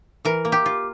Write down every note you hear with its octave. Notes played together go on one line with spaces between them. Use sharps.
E3 A#4
A#3
G4
F4